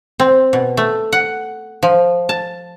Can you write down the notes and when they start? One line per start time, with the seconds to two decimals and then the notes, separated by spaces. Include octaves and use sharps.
0.20 C4
0.53 B2
0.77 A3
1.13 F#5
1.83 F3
2.29 A5